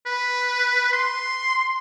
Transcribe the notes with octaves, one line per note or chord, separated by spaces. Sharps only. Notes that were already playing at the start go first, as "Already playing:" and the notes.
B4
C6